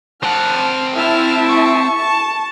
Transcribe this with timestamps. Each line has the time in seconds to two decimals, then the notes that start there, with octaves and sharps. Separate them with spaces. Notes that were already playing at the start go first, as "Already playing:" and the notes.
0.23 C4 F#5 A5 F6
0.95 E4 E5 A5 F6
1.50 C#6
1.99 A5